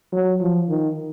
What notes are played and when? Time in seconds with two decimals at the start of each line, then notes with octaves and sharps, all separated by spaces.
0.12 F#3
0.41 F3
0.69 D#3